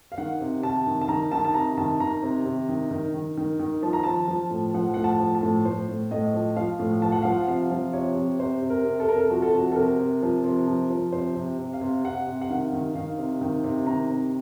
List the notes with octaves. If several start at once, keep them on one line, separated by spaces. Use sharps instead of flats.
F5
D#3 F#5
C3
C3 A5
D#3
A5
D#3 A#5
D#3 A5
A5
C3 A#5
D#3 A5
D#3 A#5
C3
C3
D#3
D#3
D#3
D#3
D#3
F3 A5
A#5
F3 A5
F3
A2
F3 F#5
A2 F#5
A5
F3
A5
A2
A2 C5
A2
A2 D#5
F3
F3 F5
A2
F3 A5
F#5
F3 F5
F#5
C3 F5
F3
C3 C#5
C3
C3 C5
C3
A#4
C3
A4
C3 A#4
A4
F3 F#4
A4
C3 F#4
A4
C3 A#4
C3
F3
C3
F3
F3
C3 C5
C3
C3
F5
C3
C3 F#5
C3
F#5
D#3 F5
D#3
D#3 F5
C3
D#3
C3
D#3 A#5
C3